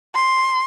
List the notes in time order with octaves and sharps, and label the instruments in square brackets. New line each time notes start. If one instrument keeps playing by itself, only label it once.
[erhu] C6